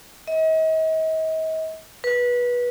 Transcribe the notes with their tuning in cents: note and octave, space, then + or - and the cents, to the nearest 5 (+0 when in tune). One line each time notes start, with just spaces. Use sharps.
D#5 +40
B4 -20